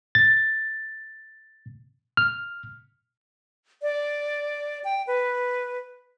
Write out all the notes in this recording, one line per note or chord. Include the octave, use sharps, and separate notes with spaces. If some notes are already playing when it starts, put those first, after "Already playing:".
A6
F6
D5
G5
B4